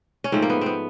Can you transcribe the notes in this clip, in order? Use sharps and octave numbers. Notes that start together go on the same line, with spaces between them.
C#4
G#2 F3 A3 C4
A#3
B3
B3 C4